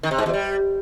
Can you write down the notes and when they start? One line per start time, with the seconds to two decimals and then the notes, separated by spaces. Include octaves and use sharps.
0.03 D#3
0.11 C3
0.18 G#2
0.26 E2
0.33 G3